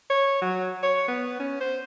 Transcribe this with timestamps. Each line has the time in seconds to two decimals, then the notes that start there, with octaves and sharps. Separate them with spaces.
0.10 C#5
0.42 F#3
0.83 C#5
1.08 B3
1.39 C#4
1.60 C5